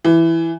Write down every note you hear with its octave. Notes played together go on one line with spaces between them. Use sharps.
E3